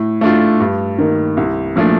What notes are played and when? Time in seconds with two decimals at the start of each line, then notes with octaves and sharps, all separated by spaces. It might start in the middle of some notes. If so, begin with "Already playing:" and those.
Already playing: A2
0.21 A3 D4 F4
0.60 G2
0.98 D#3 A#3
1.37 C2
1.76 A#2 F3 A3 D4